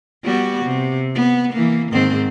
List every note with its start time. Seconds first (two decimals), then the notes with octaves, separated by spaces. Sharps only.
0.24 G3 B3 F#4
0.65 C3
1.15 B3
1.53 E3 A#3
1.92 G#2 D#3 C4